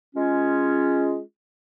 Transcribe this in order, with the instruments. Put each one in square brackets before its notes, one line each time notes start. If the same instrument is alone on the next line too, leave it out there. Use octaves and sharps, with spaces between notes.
[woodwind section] G#3 C#4 F4